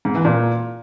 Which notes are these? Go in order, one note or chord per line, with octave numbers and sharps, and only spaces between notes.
G#2
E3
A#2